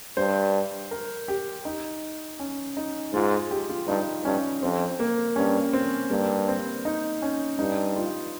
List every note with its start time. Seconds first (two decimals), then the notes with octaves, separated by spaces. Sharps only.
0.17 G2 C5
0.91 A#4
1.28 G4
1.65 D#4
2.40 C#4
2.77 D#4
3.14 G#2 F4
3.32 G#4
3.51 G4
3.69 F4
3.88 G2 D#4
4.25 G2 C#4
4.63 F2 C4
4.99 A#3
5.36 G2 C#4
5.73 C4
6.11 G2 A#3
6.48 C4
6.85 D#4
7.22 C#4
7.59 G2 D#4
7.96 F4